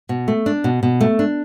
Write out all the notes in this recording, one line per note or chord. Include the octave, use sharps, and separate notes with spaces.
B2
A3
D4
B2
B2
A3
D4